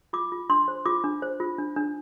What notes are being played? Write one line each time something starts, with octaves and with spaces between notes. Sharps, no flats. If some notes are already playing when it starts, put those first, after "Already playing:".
F4 D6
F4
D4 C6
C5
F4 D6
D4
C5
F4
D4
D4